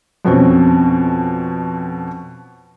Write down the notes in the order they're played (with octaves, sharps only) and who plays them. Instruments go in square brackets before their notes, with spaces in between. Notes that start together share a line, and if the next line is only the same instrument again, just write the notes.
[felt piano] F2 B2 C4 C#4